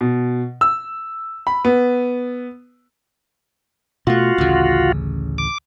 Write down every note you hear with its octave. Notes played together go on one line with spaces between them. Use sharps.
B2
E6
B5
B3
B2 A3 F4 F#4
A1 D2 C#3
D6